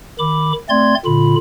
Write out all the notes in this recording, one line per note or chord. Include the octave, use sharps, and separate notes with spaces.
D#3 B5 D6
A3 C4 D5 C6 G#6
A#2 D3 F4 B5